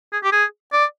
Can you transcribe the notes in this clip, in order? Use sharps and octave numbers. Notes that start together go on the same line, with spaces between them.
G#4
G4
G#4
D5